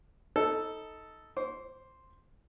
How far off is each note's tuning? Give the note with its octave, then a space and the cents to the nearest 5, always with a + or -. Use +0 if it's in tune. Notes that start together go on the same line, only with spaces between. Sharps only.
D#4 +15 A4 +0
C5 +0 D6 -40